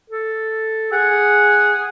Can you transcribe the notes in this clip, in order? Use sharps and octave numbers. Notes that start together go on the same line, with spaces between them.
A4
G#4 F#5